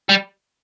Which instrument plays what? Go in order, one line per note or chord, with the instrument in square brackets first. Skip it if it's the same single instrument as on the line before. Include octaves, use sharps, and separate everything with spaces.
[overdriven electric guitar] G3